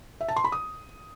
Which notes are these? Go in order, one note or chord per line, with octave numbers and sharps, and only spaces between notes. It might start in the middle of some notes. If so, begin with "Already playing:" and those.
E5
A5
C6
B5
D#6